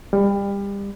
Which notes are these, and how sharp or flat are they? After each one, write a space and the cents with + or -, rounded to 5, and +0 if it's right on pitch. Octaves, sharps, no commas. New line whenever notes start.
G3 +30